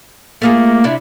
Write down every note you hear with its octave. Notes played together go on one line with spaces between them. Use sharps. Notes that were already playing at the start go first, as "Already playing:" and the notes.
A3 A#3 F4 G#4
C3 D4 E4